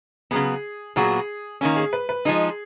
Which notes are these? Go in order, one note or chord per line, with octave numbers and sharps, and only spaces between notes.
C#3 F#3 B3 G#4
A#2 F#3 B3 F#4 G#4
D#3 A#3 C#4
G#4
B4
B4
F3 G#3 D#4 G#4